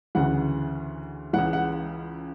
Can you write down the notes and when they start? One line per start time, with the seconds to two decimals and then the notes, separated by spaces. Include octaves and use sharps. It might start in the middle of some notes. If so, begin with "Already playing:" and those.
0.15 D2 C#3 E3 F#5
1.33 C#2 C#3 E3 F#5
1.53 F#5